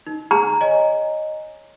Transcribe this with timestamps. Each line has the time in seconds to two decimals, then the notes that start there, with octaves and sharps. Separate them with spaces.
0.07 D#4
0.31 G#4 A#5
0.61 C#5 D#5 G#5